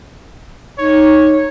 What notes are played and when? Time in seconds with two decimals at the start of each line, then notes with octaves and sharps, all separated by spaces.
0.78 D#4 C#5